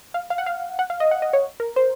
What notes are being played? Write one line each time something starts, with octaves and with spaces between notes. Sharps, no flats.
F5
F5
F#5
F5
F#5
F5
D#5
F#5
D#5
C#5
A#4
C5